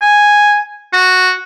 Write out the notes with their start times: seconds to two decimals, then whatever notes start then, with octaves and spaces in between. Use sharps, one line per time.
0.02 G#5
0.93 F#4